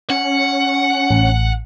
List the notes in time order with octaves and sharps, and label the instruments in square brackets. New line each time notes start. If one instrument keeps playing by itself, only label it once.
[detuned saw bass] C#4 [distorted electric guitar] F#5
[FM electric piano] A1